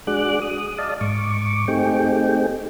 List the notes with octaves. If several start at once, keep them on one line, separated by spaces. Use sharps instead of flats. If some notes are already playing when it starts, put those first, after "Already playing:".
G#3 D4 F#4 G#4 D6 F#6
D#6
D5 D#5 F5 A5
G#2 C#6 D6
A3 C4 D#4 G4 G#4 G5